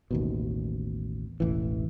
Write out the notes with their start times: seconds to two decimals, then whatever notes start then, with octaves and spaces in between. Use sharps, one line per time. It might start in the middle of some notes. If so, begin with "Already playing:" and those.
0.11 A1 D#2 B2
1.40 E1 A1 E3